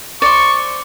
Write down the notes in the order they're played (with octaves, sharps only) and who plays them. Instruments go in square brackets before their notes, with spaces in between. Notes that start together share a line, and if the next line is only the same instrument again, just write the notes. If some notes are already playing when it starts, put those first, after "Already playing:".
[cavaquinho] C5 D5 [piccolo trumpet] C#6